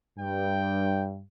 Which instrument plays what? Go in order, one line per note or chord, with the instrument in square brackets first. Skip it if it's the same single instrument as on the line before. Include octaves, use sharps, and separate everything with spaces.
[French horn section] G2 [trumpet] G5